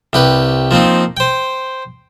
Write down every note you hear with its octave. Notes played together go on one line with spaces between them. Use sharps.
C2 G4 B4
F3 A#3 C4 D#4
C5 G5